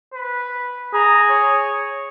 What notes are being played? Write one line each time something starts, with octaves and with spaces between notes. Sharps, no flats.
B4
G#4 A#5
C#5